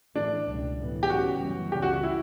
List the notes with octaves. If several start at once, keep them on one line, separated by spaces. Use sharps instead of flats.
A2 E3 A3 D4
C#2 B2 G3
A2 E3 B3
G4
D2 C#3 G3 C#4 F#4
F#2 E3 G3 B3
C#2 C#3 G3 G4
F#4
F#4
E4